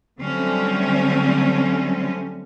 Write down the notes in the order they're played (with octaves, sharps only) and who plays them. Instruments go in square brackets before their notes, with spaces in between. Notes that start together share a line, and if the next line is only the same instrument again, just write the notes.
[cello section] D3 F#3 G3 A3 C4 C#4